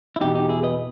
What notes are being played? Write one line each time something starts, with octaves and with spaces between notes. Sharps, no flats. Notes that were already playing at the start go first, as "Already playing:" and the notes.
E4
E2 B2 D#4 G4
D#4 G4
E4 G#4
B4 D#5